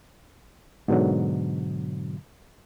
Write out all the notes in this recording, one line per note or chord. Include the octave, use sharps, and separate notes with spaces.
G#2 B2 D3 F#3